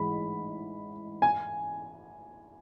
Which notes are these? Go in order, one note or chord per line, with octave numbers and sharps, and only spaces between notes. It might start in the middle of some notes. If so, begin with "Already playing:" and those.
Already playing: A1 G#2 E3 G#3 B5
G#5